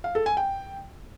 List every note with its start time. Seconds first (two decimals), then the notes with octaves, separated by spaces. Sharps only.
0.04 F5
0.15 A4
0.26 G#5
0.37 G5